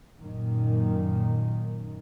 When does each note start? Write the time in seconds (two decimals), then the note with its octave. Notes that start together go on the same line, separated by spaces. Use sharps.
0.21 F#2 A#2 D#3